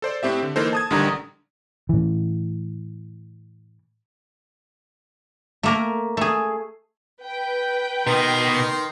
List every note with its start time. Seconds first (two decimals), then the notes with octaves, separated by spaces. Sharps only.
0.02 A4 C5 D5
0.23 A2 C4 G4 E5
0.43 D3
0.56 E3 A#3 D#4 A4 A#4 C5
0.73 A5 D#6 G#6
0.90 A1 D3 D#3 G3 D4 A#5
1.89 A2 E3
5.63 A3 A#3 A#4
6.17 A3 G#4
7.25 B4 G5
8.07 B2 D#3 D#5 A#5 C6